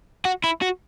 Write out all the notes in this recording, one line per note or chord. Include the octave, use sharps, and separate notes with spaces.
F#4
E4
F#4